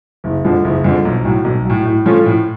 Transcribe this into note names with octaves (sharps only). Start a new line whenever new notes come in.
F#1
F2 D3 F3
F#1
F2 D3 F3
B1
A2 F#3
B1
A2 F#3
A2
F3 A3 C#4 F4
A2